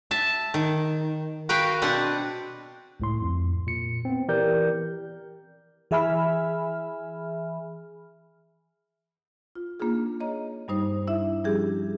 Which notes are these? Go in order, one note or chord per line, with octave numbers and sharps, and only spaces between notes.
E5 A5
D#3
F#4 A#4 B4 F5 G5
B2 C4 D4 B4 F#5
C#2 A2 C6
F2
A#2 C#7
B3 C4
E3 G4 A#4 D5 G6
E3 G#4 E5 G#5 B5 F6
F4
A#3 D4 D#4 F4 G#4
C#5 D#5 A#5
G2 G3 D#4 C5 D#6
D4 E4 E5
F3 G3 C#4 D4 G4 G#4